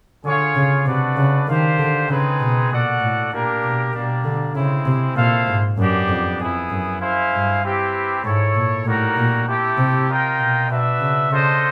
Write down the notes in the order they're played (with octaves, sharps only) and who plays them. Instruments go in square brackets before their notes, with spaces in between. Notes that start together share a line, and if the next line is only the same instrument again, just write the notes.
[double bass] D3 [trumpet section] F4 G#4 C#5 F5
[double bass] C#3
[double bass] C3 [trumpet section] A3 D4 F#4 B4 D5
[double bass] C#3
[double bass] D#3 [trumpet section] D4 G4 C5 F5
[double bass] D3
[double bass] C#3 [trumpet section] G#3 C4 D#4 G#4 B4
[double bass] B2
[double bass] A#2 [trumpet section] F#4 A4 D5 F#5
[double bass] A2
[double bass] A#2 [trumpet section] A#3 D4 G4 A#4
[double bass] B2
[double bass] B2 [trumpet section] G3 A#3 D4
[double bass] D3
[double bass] C#3 [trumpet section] G#3 C4 E4
[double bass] C3
[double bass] A#2 [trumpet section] E4 A4 C5 F5
[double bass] G#2
[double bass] F#2 [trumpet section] B3 D4 G4
[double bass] F2
[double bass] F2 [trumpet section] B3 E4 G#4
[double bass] F#2
[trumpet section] E4 G#4 C5 F5
[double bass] G2
[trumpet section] C4 E4 G4 B4
[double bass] G#2 [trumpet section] E4 A4 C#5
[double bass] A#2
[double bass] A2 [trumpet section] G3 A#3 D#4 F#4 A#4
[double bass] A#2
[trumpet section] A3 C4 E4 G4
[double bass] C3
[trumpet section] F4 A#4 D#5 G5
[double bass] B2
[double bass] B2 [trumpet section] D4 F#4 B4 E5
[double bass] C#3
[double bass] C#3 [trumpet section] D4 F4 A4 C5 D#5